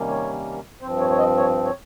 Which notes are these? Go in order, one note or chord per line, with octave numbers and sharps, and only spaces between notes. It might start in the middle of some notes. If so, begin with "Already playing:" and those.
Already playing: C3 D#3 G3 A#3 C#4
C#5
G2 F3 C4 C5
C#5
C#5
D#5
C#5
C#5